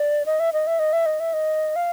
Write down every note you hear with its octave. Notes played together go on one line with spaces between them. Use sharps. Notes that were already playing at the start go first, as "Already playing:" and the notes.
Already playing: D5
D#5
E5
D#5
E5
D#5
E5
D#5
E5
D#5
F5